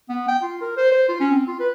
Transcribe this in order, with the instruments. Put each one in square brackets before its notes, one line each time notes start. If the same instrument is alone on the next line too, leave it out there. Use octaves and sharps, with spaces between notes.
[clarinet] B3
G5
F4
A#4
C5
C5
F4
C#4
C4
F4
B4